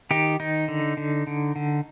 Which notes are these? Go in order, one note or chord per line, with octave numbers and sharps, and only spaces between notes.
D#3 D#4 G4
D#3 D#4
D3
D3
D3
D3